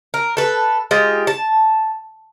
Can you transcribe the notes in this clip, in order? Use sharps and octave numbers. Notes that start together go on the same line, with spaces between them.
A#4
A4 B4
G#3 F4 G4
A5